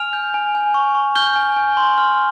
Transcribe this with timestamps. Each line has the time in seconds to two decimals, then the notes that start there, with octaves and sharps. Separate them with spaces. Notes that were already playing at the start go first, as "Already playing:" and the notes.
Already playing: G#5 F6 F7
0.13 G6
0.34 G#5
0.55 G#5
0.74 C#6
0.95 C#6
1.15 F6 G6 G7
1.36 G#5
1.56 G#5
1.77 C6
1.98 F6